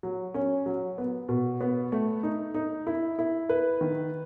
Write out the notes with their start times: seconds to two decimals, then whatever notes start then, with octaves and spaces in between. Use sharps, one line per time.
0.03 F#3
0.34 C#4
0.66 F#3
0.98 B3
1.29 B2
1.61 B3
1.92 A3
2.23 D#4
2.55 D#4
2.87 E4
3.19 E4
3.49 B4
3.81 D#3